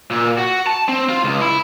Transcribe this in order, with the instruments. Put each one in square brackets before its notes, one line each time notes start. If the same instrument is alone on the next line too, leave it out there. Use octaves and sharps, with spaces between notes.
[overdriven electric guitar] A#2
F#4
A5
C4
F4
C#2
E4